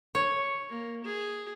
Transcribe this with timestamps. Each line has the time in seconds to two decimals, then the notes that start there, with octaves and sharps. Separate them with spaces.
0.15 C#5
0.69 A#3
1.04 G#4